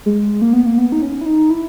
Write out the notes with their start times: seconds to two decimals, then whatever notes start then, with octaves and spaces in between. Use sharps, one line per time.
0.06 G#3
0.42 A#3
0.53 B3
0.66 A#3
0.78 B3
0.92 D#4
1.02 C#4
1.21 E4
1.26 D#4
1.50 E4